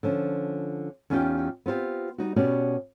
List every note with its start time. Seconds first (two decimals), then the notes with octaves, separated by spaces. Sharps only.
0.03 D3 F3 C#4
1.10 E2 C#4 D#4 F4 G4 G5
1.66 B3 C4 F4 G4
2.18 G3 D#4 F#4
2.36 B2 B3 C#4 F#4 G4 D5